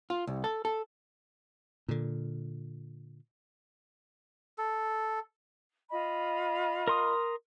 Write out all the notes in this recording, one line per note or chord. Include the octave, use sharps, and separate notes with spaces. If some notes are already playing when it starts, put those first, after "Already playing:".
F4
C2
A4
A4
A#2 D3
A4
F4 D#5 B5
A#4 C6 D#6